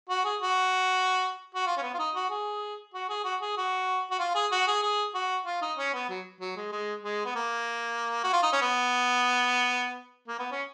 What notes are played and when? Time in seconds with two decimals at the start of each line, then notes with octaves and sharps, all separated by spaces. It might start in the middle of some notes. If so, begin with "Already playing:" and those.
0.09 F#4
0.24 G#4
0.41 F#4
1.55 F#4
1.67 F4
1.77 C#4
1.82 B3
1.94 F4
1.99 D#4
2.15 F#4
2.30 G#4
2.94 F#4
3.09 G#4
3.25 F#4
3.41 G#4
3.57 F#4
4.11 F#4
4.19 F4
4.35 G#4
4.52 F#4
4.67 G#4
4.83 G#4
5.15 F#4
5.46 F4
5.62 D#4
5.78 C#4
5.94 B3
6.09 F#3
6.41 F#3
6.57 G#3
6.72 G#3
7.03 G#3
7.25 B3
7.36 A#3
8.24 F#4
8.33 F4
8.43 D#4
8.53 C#4
8.61 B3
10.28 A#3
10.39 B3
10.51 C#4